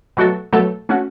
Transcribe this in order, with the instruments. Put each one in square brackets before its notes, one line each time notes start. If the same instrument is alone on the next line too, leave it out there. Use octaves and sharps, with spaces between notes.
[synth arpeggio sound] B2 F#3 A3 F#4 A4
B2 F#3 A3 F#4 A4
A3 C#4 F#4